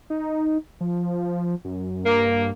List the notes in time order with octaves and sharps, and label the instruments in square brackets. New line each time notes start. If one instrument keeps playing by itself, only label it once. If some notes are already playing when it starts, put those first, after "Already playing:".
[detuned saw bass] D#4
F3
F#2
[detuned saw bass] G2 [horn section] A#3